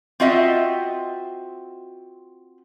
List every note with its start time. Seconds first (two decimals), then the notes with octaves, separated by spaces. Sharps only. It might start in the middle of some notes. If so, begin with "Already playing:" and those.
0.20 C4 F4 F#4 D#5 E5